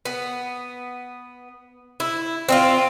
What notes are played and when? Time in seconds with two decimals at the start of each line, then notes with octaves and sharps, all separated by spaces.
0.05 B3
2.00 E4
2.48 C4 D#4 F4